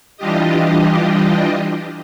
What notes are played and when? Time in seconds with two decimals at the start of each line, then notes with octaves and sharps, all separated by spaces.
0.17 E3 G3 D4 F4 G4 D#5